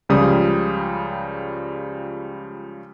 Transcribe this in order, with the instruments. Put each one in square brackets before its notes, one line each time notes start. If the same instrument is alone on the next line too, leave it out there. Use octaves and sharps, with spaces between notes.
[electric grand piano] C#2 C#3 F3 G3 D#6